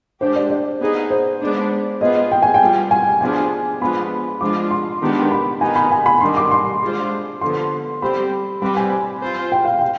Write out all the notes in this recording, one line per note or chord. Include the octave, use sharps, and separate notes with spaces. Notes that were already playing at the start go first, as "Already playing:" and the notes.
G#3 D4 G4 C5
D5
D5
B3 D#4 G#4
C5
G#3 B3 D4
B3 F4 G#4 D#5
G5
G#5
G5
G3 B3 F4 G#4
G#5
F3 B3 D4 F4 G#4 G#5
F3 G#3 B3 D4 F4 B5
F3 G#3 D4 F4 D6
C6
D#3 G#3 B3 D4 G4
B5
D#3 B3 D#4 G#5
B5
G#5
B5
D#3 G3 D4 C6
D6
C6
G#3 D4 F4 C5
D3 F3 B3 C6
G3 C4 G4 C5 B5
G3 C4 G4 B4 B5
G#5
C4 F4 C5
G5
F5
G5